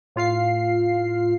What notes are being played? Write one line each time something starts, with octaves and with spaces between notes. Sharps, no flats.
A2 F4 F5 C7